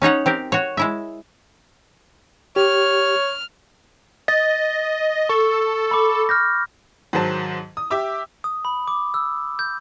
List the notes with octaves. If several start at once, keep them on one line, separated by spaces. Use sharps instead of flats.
C#4 D#4 C#5 F#5
C4 G4 A#4
F#4 C#5
G#3 E4 E5
G4 C#5 F6
D#5 A6
A4 C#6
B5 D6
F6 G6 A#6
G#2 D#3 F#3 C5 A5
D#6
G4 E5 D6 E6
D#6
B5
D6
E6
G6